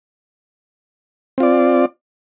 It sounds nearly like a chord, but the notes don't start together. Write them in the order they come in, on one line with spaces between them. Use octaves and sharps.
C4 F4 D5